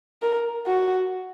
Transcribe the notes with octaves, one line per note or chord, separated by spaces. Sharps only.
A#4
F#4